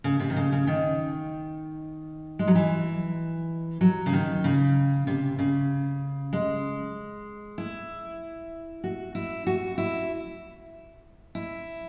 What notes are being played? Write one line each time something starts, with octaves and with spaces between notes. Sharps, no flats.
C#3
C3
D#3
C#3
C#3
D#3
G#3
F#3
E3
F#3
C#3
D#3
C#3
C3
C#3
G#3
E4
F#4
E4
F#4
E4
E4